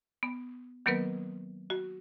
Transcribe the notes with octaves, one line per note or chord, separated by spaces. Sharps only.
B3
D#3 F#3 A#3 B3 A#4 B4
F#4